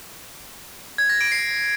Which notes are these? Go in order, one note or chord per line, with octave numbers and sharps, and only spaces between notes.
G#6
A#6
D7
C7